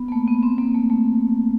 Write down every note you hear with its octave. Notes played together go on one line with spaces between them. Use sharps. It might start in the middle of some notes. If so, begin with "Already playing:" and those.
Already playing: B3
A#3
A3
B3
C4
A#3
A3
A3